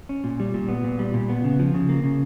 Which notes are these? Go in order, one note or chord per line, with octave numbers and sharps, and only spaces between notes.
C#4
A#2
G3
A#2
B3
A#2
G3
A#2
B3
C#3
F3
C#3
A#3
C#3